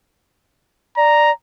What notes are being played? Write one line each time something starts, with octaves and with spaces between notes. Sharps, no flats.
D5 A#5